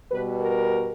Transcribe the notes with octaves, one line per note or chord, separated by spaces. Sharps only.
B2 G3 B4
A#4